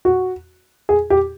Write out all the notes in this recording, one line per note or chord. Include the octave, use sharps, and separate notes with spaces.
F#4
G#4
G4